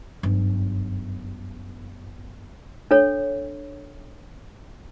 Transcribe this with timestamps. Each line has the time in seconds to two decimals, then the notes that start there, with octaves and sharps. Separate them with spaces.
0.23 G1 F#2
2.91 D4 A4 C#5